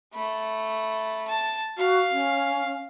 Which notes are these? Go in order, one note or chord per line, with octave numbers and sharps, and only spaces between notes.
A3 B5
A5
F#4 F5
C#4